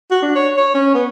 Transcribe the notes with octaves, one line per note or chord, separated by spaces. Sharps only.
F#4
D4
C#5
C#5
C#4
B3